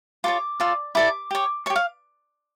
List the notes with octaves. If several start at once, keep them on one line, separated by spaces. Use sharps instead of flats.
F4 A4 C#5 D6
F4 A4 D5
E4 A4 D5 D6
G4 C#5
G4 C#5 C#6
F5